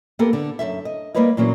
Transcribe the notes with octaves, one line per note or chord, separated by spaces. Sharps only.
A#3 B3 G4 A4 A#4
D3
F#2 C3 A4 E5
D#5
G3 A#3 A#4 B4 C#5 D#5
A#2 E3 F#3 A#3 C#4